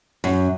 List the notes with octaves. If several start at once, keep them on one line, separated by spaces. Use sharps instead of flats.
F#2